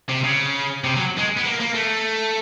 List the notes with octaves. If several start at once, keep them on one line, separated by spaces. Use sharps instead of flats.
C3
C#3
C3
F#3
G#3
B3
A#3
A#3
A3